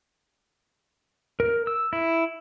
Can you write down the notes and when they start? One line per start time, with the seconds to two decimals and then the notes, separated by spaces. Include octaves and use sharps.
1.40 A#4
1.67 E6
1.93 E4